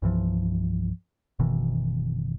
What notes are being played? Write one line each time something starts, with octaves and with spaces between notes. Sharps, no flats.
C2 G2 E3 F3
F#1 B2 D#3 E3